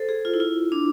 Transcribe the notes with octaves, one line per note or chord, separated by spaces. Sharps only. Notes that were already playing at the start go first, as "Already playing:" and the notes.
Already playing: A4 C5
G#4
F4
E4
F4
D4